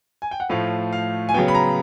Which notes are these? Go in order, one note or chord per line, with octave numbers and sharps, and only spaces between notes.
G#5
G5
F#5
A2 F3 A3 F5
F5
G#5
C#3 F#3 B3 G5
B5
A#5